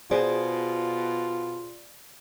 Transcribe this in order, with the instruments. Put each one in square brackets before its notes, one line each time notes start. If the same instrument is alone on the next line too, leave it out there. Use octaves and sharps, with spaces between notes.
[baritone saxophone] B2 [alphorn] F4 [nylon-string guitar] G#4 C5 [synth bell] D5